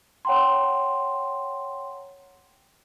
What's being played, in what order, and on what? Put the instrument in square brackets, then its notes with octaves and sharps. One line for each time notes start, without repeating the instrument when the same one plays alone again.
[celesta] C#5 F#5 G5 A#5 C6